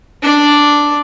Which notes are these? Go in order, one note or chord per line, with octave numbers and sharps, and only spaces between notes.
D4 D5